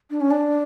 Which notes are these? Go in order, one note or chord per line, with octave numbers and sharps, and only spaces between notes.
D4
C#4
D4